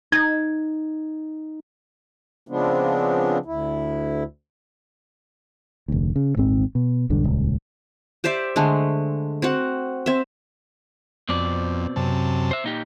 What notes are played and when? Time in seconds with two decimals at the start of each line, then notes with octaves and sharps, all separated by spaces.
0.12 D#4 G#6
2.48 C#3 F3 G#3 B3 C4 D4
3.46 D2 E4
5.88 F1 D2
6.16 C#3
6.36 D#1 G#1 G#2 C4
6.75 B2
7.10 E1 B1 G2 D3
7.24 D#1 C#2
8.24 G4 C5 D5 E5
8.56 D3 G#3 A3
9.42 C4 F#4 F#5
10.06 C4 E5
11.29 F2 B2 C4 D5
11.96 F#2 C3 A5
12.51 C5 E5
12.64 A#2 D#4 G4